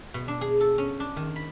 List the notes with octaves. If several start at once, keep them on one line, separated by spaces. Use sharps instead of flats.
B2
D4
G#4
A4
C#4
D4
D#3
B5